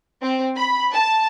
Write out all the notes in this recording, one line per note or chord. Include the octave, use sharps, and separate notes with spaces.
C4
B5
A5